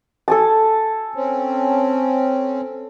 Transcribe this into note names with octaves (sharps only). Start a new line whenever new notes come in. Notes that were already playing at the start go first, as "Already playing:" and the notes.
A4 G#5 A5
C4 C#4